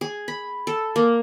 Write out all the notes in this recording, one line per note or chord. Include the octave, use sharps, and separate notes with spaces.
G#4
B5
A4
A#3